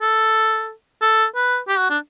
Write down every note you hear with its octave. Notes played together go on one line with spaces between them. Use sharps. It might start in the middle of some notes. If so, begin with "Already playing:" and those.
A4
A4
B4
G4
F#4
D4